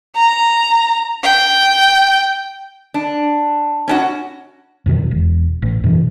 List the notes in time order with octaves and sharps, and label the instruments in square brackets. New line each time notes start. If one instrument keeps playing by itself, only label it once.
[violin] A#5
G5
[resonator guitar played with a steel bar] D4
C#4 D4 F#4
[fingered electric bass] F2 B2 D3 D#3
E1
A1
F#2 B2 E3